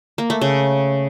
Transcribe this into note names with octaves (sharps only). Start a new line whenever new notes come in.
A#3
A3
C#3